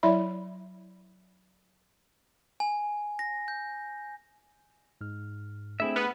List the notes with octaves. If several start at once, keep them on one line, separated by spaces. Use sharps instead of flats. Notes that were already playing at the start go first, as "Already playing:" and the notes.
F#3 E4 D5 E5 B5 C6
G#5
A#6
G6
G#2 F6
A3 C4 D4 E4 G#4 E5
B3 B4 F#5 D#6 F6